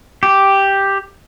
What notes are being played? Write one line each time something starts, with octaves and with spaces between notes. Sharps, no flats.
G4